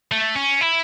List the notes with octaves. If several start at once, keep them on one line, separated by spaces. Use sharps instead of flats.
A3
C#4
E4